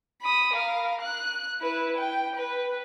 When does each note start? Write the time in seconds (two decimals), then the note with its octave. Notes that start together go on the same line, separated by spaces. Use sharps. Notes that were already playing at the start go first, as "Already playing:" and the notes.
0.22 B5 D#6
0.53 A#4 F5
1.01 F#6
1.61 E4 B4
1.97 G5
2.36 B4